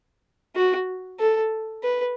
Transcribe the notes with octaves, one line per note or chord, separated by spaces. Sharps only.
F#4
A4
B4